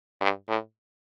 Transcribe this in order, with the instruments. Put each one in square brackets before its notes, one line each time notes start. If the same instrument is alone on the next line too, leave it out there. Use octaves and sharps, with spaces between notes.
[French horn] G2
A2